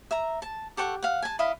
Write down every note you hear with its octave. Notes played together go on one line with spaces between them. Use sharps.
E5 A#5
A5
G4 A4 F#5 C#6
F5 F#5
G#5 A5
E4 D#5 F5 B5